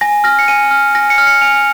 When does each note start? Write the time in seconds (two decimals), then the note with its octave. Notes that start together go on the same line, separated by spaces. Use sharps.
0.01 G#5 A#6
0.24 F6 A#6
0.39 C#7
0.48 G#5 D#7
0.71 F6
0.95 G#5 A#6
1.10 C#7
1.18 F6
1.27 C#7
1.41 G#5 F7